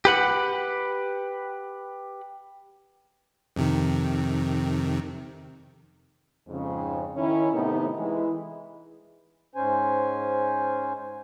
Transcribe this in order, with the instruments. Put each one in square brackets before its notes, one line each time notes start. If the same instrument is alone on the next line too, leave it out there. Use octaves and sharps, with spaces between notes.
[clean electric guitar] G4 B4 F#5
[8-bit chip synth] F2 C3 D#3
[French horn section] F2 G#2 C#3
D#3 C#4 E4
A2 C3 D#3 A3 B3 D#4
E3 G#3 E4
[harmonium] G#2 C#4 C5 G#5